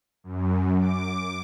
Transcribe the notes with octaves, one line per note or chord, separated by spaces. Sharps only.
F#2
D6